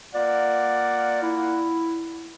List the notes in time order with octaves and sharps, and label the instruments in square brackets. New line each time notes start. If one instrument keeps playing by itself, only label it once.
[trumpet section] A#3 F4 F#5 [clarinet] D5
[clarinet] E4